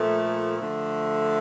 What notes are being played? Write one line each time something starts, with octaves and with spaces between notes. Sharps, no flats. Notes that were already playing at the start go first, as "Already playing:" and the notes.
Already playing: A#2 F3 A3
D3 F3 A3